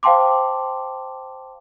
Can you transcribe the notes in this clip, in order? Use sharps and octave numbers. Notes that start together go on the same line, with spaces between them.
C5 F5 G5 A5 C6 D6